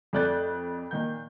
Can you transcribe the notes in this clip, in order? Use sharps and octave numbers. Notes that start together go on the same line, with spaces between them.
F2 A3 D5 F#6 G6 A6
A#2 D#3 G6